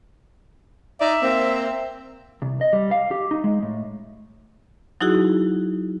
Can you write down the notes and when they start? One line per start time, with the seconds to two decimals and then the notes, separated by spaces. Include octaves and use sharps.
1.01 D#4 D5 E5
1.22 A#3 C4
2.42 C2
2.61 D#5
2.73 G3
2.91 F5
3.11 G4
3.31 D#4
3.44 G#3
3.62 A2
5.01 F#3 D#4 E4 F#4 G#4